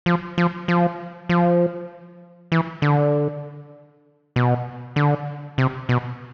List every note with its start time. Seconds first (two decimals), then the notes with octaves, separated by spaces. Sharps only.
0.06 F3
0.38 F3
0.68 F3
1.29 F3
2.52 E3
2.82 D3
4.36 B2
4.96 D3
5.58 C3
5.89 B2